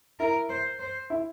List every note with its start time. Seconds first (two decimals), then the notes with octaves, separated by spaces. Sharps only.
0.19 E4 A#4
0.49 C5
0.79 C5
1.10 E4